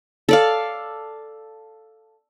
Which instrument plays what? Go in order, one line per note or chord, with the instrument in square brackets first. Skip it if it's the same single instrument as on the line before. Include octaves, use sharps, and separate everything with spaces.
[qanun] A4 D5 F5